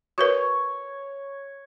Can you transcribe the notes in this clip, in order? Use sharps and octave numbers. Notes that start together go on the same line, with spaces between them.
F#4 A#4 B4 C#5